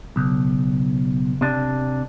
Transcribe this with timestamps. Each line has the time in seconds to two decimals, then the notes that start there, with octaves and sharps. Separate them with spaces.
0.16 B1 C#3
1.41 C3 D4